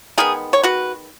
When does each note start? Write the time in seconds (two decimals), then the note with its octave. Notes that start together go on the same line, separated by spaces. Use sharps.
0.18 D#3 G#3 B3 D#4 G#4
0.53 C#5
0.63 F#4 B4